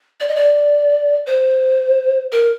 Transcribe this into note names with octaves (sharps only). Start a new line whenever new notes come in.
D5
D#5
D5
C5
A#4